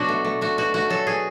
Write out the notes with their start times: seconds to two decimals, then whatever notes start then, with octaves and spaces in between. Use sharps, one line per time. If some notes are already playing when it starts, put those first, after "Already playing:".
Already playing: B2 F#3 B3 D4 F#4
0.09 A3
0.25 A3
0.41 A3 F#4
0.58 B2 F#4
0.74 A3 F#4
0.90 F#3 A4
1.07 B2 G#4